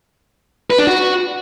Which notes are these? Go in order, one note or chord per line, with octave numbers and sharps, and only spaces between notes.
B4
D4
F#4